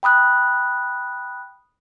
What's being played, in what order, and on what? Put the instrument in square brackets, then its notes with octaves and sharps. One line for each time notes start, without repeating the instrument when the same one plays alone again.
[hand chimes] G5 B5 D#6 F#6